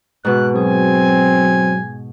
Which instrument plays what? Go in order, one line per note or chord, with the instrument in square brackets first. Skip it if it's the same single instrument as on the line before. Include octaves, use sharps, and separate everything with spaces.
[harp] G#2 B2 [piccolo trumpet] F#6
[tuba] F#3 [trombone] C4 [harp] G#4 [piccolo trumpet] G#5